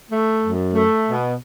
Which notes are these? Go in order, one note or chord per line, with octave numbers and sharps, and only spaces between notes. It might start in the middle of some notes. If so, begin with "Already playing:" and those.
A3
F#2
A3
B2